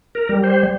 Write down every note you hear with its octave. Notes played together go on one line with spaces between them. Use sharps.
A#4
G3
C5